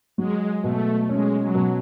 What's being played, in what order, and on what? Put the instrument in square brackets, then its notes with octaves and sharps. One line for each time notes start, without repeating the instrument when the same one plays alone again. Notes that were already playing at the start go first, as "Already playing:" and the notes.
[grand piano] F#3 [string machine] G#3
[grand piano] B2 [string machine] A3
[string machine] G#3 [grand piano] C#4
[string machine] F#3
[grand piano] B2